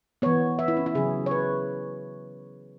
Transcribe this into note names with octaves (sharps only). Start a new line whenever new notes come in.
E3 B3 C#5
E5
E4
C#4
E4
C#3 F#3 C#4 G#4
C#5
B4